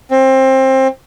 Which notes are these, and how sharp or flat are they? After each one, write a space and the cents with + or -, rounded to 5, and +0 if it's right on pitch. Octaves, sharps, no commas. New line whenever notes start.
C4 +20